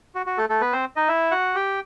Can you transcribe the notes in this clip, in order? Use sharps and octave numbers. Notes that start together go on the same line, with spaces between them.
F#4
F#4
A3 A4
A3 A4
B3 B4
C4 C5
D#4 D#5
E4 E5
F#4 F#5
G4 G5